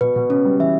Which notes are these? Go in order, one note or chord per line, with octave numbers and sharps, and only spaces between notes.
B2 B4
B2
C#3 C#4
G3
E3 E5